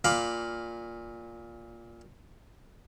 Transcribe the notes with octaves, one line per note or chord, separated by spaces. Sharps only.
A#2 F5 B5 D6